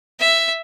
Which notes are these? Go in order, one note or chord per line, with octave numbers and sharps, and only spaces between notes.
E5